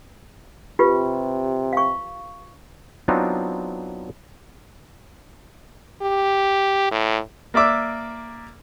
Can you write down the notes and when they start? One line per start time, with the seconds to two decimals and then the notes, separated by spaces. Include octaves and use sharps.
0.79 C3 F4 G4 B4
1.73 F5 C#6
3.08 F#3 B3 C4 D4 D#4 F4
6.02 G4
6.91 A2
7.54 A#3 D5 E5 D6 E6